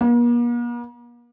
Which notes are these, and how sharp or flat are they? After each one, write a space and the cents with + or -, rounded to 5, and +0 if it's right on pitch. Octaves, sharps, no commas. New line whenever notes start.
A#3 +45